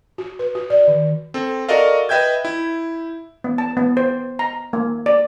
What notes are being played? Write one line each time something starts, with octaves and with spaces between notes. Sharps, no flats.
F#4
B4
F#4
D5
D#3
C4 A4
F#4 A4 A#4 D5 D#5 F5
B4 D#5 E5 G5 G6 G#6
E4
B3
A5
B3
C5
A#5
A#3
D5